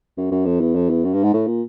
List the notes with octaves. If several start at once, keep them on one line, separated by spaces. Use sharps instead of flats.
F#2
F#2
F2
E2
F2
E2
F#2
G2
G#2
A2
A#2